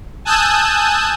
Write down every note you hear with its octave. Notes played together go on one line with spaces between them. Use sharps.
G#5 A5 D#6 E6 F#6 G6